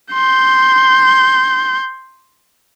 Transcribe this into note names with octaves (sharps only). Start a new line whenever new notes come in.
C6 G6